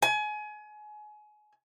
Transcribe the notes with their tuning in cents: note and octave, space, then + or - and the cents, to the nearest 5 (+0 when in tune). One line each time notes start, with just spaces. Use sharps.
G#5 +30